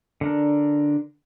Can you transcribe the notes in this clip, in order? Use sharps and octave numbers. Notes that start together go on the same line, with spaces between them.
D3 D4 A#4